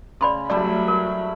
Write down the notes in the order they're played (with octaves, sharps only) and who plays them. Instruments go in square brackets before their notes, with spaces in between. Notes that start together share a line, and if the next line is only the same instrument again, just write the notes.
[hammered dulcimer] C#3 [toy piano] D5 B5 C6
[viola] F#3 B5 [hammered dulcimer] G3 A3 E4 [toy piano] D5
[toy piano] A#4